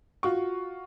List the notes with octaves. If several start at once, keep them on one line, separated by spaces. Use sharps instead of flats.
F4 F#4 C#6